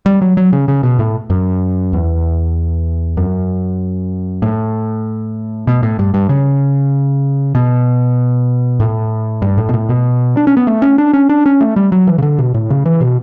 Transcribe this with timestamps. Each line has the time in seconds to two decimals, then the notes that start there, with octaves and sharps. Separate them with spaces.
0.06 G3
0.22 F#3
0.37 F#3
0.53 C#3
0.68 C#3
0.83 B2
0.99 A2
1.30 F#2
1.93 E2
3.17 F#2
4.42 A2
5.67 B2
5.83 A2
5.99 G2
6.14 G2
6.29 C#3
7.55 B2
8.80 A2
9.42 G2
9.57 A2
9.69 B2
9.74 A2
9.89 B2
10.37 D4
10.47 C#4
10.57 B3
10.67 A3
10.82 C#4
10.98 D4
11.13 C#4
11.29 D4
11.46 C#4
11.61 A3
11.76 G3
11.92 F#3
12.07 E3
12.18 C#3
12.22 D3
12.39 B2
12.54 A2
12.70 C#3
12.86 E3
13.01 B2